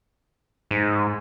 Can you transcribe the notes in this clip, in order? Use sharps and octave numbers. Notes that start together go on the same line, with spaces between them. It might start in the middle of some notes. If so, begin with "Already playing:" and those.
G#2